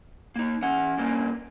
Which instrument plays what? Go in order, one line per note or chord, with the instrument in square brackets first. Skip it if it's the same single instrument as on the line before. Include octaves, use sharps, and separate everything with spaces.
[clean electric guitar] A#3 D#4
[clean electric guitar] E3 F#5 [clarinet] C#4
[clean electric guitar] G2 A#2 A#3